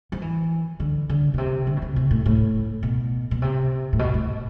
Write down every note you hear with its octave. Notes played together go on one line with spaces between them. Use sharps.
F3
E3
D3
D3
B2
C3
D3
B2
C3
C3
A2
A2
B2
B2
C3
A2
B2
A2